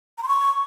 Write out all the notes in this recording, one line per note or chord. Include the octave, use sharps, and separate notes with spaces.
A#5
C6
C#6